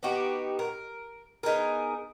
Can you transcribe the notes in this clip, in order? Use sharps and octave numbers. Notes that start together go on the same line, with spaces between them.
B3 D#4 F#4 G4
A#4
B3 D#4 G#4 A#4